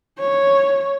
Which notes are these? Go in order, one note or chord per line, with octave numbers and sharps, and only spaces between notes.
C#5